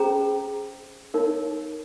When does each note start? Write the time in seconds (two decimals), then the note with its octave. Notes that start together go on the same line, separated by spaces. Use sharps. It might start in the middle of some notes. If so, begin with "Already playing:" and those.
Already playing: C#4 G#4 C5 A#5
1.14 D#4 A#4 C#5